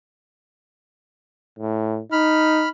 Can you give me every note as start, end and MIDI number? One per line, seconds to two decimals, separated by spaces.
1.59 2.00 45
2.12 2.68 63
2.12 2.69 83
2.12 2.69 89